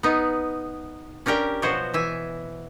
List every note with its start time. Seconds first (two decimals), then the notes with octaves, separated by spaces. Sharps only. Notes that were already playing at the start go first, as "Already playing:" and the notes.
0.03 B3 D#4
1.26 C#4 D4 G4 A#4 G5
1.62 B2 F3 F#3 F#4 C5 C#5
1.94 E3 E5 G#5